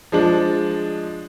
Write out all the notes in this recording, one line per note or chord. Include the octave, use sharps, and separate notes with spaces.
F3 G#3 D4